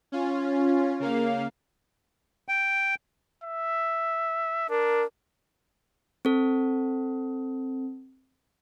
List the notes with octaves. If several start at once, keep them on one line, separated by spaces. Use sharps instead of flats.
C#4 F4
C#3 A#3 F5
G5
E5
D4 A#4
C4 A4